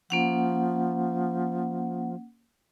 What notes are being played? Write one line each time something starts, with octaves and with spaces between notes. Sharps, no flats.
F3 A#3 C#4 F#5